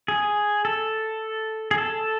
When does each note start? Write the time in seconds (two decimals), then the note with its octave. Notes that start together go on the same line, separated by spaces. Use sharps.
0.08 G#4
0.65 A4
1.71 G#4
1.78 A4